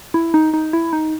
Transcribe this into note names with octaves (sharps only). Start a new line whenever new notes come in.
E4
D#4
D#4
E4
D#4